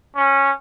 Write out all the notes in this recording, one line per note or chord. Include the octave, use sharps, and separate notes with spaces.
C#4